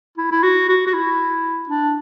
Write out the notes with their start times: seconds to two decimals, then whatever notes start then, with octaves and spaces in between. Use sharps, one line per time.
0.18 E4
0.31 E4
0.43 F#4
0.69 F#4
0.86 F#4
0.93 E4
1.69 D4